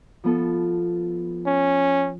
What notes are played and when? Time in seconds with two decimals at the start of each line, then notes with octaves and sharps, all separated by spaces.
0.24 F3 B3 A4
1.46 C#4